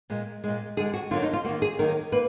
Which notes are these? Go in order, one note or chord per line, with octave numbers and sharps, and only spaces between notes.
A#2 G#3
A#2 G#3
D3 G#3 G#4
F#4
D3 F#3 A#3 F4
D#4
F4
D#3 A#3 F#4
G#4
D#3 F#3 A#3 A#4
A#3 B4